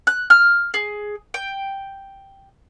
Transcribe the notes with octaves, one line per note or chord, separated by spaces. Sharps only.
F#6
F6
G#4
G5